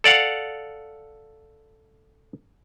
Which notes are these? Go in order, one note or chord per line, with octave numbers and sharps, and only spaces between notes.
A4 D5 F5 F#5